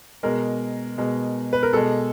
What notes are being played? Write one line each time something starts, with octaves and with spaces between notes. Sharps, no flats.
B2 G#3 A#4
B2 G#3
B4
A#4
B2 G#3 A4